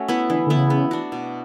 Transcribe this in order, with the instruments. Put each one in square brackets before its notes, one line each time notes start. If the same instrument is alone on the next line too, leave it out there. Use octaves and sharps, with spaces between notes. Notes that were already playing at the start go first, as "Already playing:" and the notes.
Already playing: [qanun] A3 C#4 F#4
B3 E4 B4
[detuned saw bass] D3 [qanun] E3
[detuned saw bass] D3 [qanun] B3 E4
[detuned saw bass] C#3
[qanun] B3
D4 F#4
B2